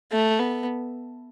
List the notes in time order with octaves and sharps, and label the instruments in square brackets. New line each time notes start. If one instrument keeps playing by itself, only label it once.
[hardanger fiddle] A3
B3